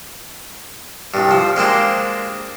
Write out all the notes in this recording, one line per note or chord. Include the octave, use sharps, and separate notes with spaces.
C2 G2
F3
G#3 A#3 C4 D4